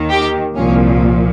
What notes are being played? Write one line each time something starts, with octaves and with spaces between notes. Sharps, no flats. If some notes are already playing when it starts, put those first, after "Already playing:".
Already playing: D#2 D#3
G4
C2 A#2 F3 C#4